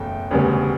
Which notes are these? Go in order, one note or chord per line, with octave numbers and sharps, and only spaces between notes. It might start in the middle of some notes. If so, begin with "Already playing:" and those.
Already playing: F#1 E2 B2 A3 G5
E1 D2 C#3 G3 B3